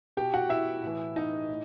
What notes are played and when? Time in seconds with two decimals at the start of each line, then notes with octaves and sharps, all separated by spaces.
0.17 B2 G4 G5
0.34 F#4 F#5
0.49 E4 E5
0.83 A2 E3
1.16 D#4 D#5
1.49 A2